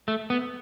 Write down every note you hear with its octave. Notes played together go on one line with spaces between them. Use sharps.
A3
B3